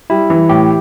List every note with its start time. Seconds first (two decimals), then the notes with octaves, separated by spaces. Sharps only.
0.10 G3 E4
0.30 E3
0.49 A2 G4